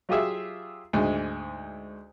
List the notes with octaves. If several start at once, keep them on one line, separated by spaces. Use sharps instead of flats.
F#3 F4 G4 G#4 E5
D2 G#2 G#3